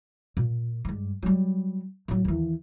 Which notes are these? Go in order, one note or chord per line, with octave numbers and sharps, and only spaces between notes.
A#2
G2 G#3
F#3 G3
A2 F#3
D#2 E3